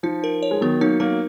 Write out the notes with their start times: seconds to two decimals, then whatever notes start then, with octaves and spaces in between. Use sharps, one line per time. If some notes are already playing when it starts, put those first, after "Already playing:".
0.03 F3 D#4
0.24 A#4
0.43 C#5
0.51 G#3
0.61 D#3 F#3 B3
0.81 F#3 A#3 D#4
1.00 F#3 A#3 A#4